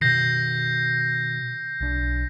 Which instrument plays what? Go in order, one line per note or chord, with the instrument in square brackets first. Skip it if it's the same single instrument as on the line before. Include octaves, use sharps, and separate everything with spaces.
[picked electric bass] B2 D#3 [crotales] G6 A#6 C7
[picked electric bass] B1 D4